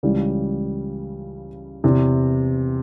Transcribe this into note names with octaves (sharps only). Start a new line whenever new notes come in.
C#2 C#3 E3 G3
E2 C3 E3